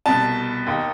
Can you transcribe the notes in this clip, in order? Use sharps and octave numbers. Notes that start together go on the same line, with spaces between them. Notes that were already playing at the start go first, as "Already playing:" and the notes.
C2 B2 A5
D#2 D#3